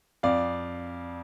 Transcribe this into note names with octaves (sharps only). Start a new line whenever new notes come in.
F2 D5 F5